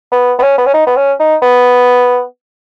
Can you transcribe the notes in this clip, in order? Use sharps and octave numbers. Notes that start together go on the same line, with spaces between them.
B3
B3
C#4
B3
C#4
D#4
B3
C#4
D#4
B3